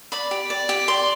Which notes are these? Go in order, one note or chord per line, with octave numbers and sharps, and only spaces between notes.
D5 B5
G4
D5
G4
D5 C6